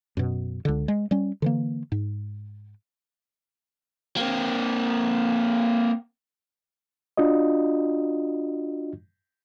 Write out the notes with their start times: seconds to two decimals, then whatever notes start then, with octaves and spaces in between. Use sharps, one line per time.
0.17 F#2 B2
0.65 C#2 D3
0.88 G#3
1.11 G3 C#4
1.42 D3 E3 A#3
1.92 G#2
4.17 A#3 C4
7.17 D4 F4 F#4 D#5